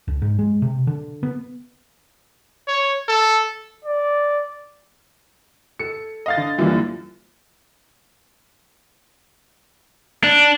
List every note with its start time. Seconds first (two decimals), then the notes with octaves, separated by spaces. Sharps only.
0.08 C#2
0.22 G#2
0.39 G#3
0.62 C3
0.87 D3
1.23 B3
2.68 C#5
3.08 A4
3.85 D5
5.79 A4 C#7
6.26 D#5 F5 A6
6.38 D3
6.59 F#2 D3 E3 G3 A#3 F4
10.24 D4